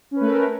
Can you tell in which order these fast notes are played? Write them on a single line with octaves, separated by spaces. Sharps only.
C#4 B4 A3 A#4